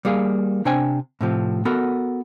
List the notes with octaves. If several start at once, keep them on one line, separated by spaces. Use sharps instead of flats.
G3 A#3 G#4 F5
C3 D4 C5 G5 G#5
A2 C3 F3
B3 F#4 A4 A#4